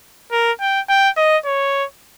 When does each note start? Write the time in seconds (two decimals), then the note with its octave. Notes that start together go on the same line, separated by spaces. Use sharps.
0.32 A#4
0.61 G5
0.89 G5
1.17 D#5
1.45 C#5